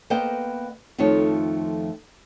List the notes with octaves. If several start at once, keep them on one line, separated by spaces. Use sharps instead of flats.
A#3 B3 C5 D#5 G5
F2 D#3 F3 A3 C#5